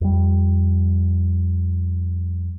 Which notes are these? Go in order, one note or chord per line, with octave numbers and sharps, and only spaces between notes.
F2 G3